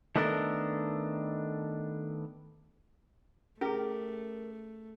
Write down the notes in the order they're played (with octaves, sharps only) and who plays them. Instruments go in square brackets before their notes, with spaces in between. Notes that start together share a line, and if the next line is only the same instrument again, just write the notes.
[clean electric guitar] D#3 A3 B3 D4 A4 A#4
[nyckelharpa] A3 [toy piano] C#4 G#4 [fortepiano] G4 [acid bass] A#4